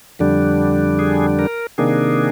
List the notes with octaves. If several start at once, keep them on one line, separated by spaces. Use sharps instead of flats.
F2 D3 G3 D4
G#4
A#4
C3 D#3 A#3 D4 G#4